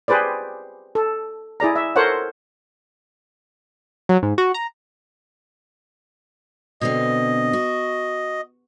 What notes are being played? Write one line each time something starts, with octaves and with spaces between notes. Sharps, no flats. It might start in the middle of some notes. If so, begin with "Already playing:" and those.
G4 G#4 B4 C5 D5
A4
E4 G#4 D5 A#5
E5
A4 A#4 C5 C#5 F#5
F#3
G#2
F#4
A#5
B2 D3 C4 D#5
F#4